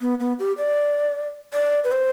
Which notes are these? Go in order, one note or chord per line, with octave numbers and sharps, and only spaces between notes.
B3
B3
G4
D5
D5
B4
C5